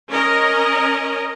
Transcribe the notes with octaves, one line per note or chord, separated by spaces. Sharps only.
C#4 A#4 D#5